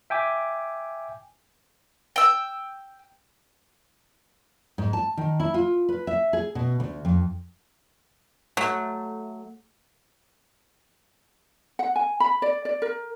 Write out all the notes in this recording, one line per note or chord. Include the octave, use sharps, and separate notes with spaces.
E5 G5 G#5 D6
G5 E6
G#2
A5
D#3
E4
F4
B4
E5
G#4
B2
D2
F2
F#3 A3
F#5
G#5
B5
D5
D5
A#4